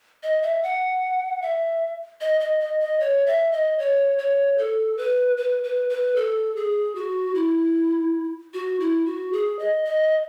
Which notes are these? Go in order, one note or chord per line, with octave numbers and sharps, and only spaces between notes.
D#5
E5
F#5
E5
D#5
D#5
D#5
D#5
C#5
E5
D#5
C#5
C#5
A4
B4
B4
B4
B4
A4
G#4
F#4
E4
F#4
E4
F#4
G#4
D#5
D#5